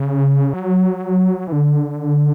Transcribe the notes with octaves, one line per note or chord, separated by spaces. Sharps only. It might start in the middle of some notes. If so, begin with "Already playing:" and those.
Already playing: C#3
F#3
E3
D3